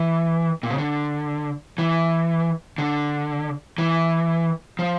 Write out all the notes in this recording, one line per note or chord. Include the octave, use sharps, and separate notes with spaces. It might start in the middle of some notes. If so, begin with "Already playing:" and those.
Already playing: E3
A#2
C#3
D3
E3
D3
E3
F3